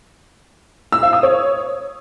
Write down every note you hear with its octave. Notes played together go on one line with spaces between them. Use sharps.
E6
F5
D#6
C#5